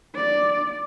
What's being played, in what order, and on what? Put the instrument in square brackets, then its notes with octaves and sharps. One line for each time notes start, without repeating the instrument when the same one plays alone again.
[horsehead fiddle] D5